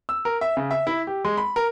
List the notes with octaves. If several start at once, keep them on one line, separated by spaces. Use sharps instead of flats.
E6
A#4
E5
C#3
E5
E4
G4
G#3
B5
A#4